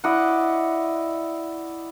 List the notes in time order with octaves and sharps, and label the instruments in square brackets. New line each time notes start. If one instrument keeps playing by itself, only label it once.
[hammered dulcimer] E4 D5 D#5 F#5